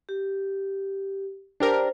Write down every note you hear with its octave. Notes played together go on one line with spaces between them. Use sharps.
G4
D4 G4 A#4 C5